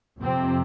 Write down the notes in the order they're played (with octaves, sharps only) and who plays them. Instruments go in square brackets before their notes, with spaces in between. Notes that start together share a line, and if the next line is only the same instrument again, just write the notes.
[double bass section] F2 C3 C4